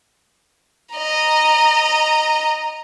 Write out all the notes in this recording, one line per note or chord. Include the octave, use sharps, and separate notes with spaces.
D#5 A#5